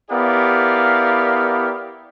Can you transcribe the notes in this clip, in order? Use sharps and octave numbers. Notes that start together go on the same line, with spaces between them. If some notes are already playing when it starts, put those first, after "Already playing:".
B3 E4 G4 A#4 D5 F5